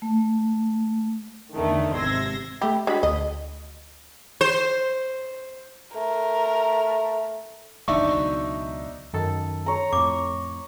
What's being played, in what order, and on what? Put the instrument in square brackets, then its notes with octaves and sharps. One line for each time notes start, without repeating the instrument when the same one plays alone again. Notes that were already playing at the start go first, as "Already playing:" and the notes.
[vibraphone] A3
[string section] E2 D3 D#3 A3
G#1 C3 C6 E6 G#6 A#6
[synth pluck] A3 E5 B5 [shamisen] G4
[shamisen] G#3 D4 [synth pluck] F#4 G#4 B5
[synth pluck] D2 [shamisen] D#5
[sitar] C5
[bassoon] A3 [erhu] A#4
[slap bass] F#1 D#2 E3 [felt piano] D4 D#4 E5 [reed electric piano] C#6
[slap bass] C#2 B2 F#3
[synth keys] F#2 D#3 A4
[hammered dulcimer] C#5 A#5
[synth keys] F2 A2 [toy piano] D6